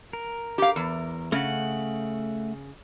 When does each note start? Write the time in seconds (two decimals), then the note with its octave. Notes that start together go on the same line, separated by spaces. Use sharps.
0.13 A#4
0.58 G4 F5
0.76 E2
1.32 C#3 A3 F#5